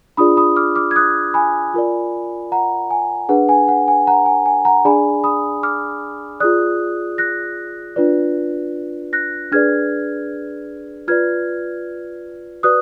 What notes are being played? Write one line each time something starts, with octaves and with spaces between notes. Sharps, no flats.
D4 F4 G#4 D5 B5 D#6
B5 D#6
D6 F6
D6 F6
G#6
D#6 F#6
G#5 B5
F4 A#4 D5
F#5 A#5
G#5
D4 G#4 B4 F#5
G#5
F#5
G#5
F#5 A#5
G#5
G#5
F#5 A#5
D4 G#4 D5 G#5 B5
B5 D#6
D6 F6
F4 G#4 D5 D#6 F#6
F#6 A#6
D4 F4 B4 D5
F#6 A#6
D4 G#4 B4 D5 F6 G#6
F4 B4 D5 F6 G#6
F#4 B4 D5 D#6 F#6